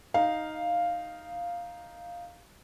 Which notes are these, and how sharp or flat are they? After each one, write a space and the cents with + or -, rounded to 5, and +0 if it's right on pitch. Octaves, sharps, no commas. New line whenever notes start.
D#4 +0 F5 +0